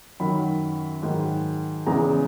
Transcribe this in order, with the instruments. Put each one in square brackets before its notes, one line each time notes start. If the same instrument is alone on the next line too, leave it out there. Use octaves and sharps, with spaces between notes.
[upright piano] F#2 D#3 F#3 B5
G#2 D#3 F#3
E2 C#3 E3 G#3 A#5